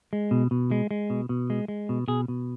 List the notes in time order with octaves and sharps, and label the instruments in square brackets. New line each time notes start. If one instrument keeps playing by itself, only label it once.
[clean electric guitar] G#3
B2
B2
G#3
G#3
B2
B2
G#3
G#3
B2
B2 G#4
B2